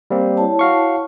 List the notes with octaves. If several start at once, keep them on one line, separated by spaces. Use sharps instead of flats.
G3 A#3 C4
E4 C#5 A5
F#4 F5 C#6